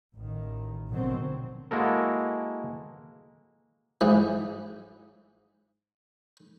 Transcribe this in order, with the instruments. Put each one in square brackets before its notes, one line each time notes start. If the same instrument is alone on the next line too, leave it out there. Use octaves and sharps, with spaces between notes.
[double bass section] A1 D#3
A#1 B2 D3 D#3 F#3 C4
[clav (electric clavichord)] G#3 A#3 E4 F#4 A4 A#4
[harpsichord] G#2 E3